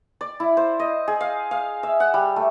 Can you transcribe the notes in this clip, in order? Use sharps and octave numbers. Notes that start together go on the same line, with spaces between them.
D5
E4
C5
D#5
G#4
F5
F5
E5
F#5
G3
A3